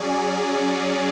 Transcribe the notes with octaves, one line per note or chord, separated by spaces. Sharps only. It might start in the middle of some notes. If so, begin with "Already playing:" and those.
Already playing: F#3 C#4 G#4 D5